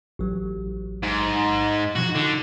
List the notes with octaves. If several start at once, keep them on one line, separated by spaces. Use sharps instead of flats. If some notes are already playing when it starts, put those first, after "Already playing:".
A1 F#3
G#2
B2 F3 D#4 F#4
D3